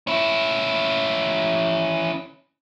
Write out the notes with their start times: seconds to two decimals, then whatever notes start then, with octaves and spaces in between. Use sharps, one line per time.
0.07 C#4 E4